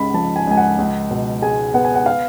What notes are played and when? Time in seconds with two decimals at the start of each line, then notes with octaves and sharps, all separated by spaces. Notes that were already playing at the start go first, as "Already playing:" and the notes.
Already playing: C#2 C#3 B5
0.14 F3 A5
0.36 G#5
0.47 C#2 G#5
0.57 F#5
0.79 C#2
1.11 B2
1.42 G#3 G#5
1.74 B3 F#5
1.85 G#5
1.95 F#5
2.06 F5